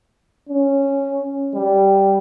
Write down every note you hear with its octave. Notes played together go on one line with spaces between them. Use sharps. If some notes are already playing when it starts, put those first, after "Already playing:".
C#4
G3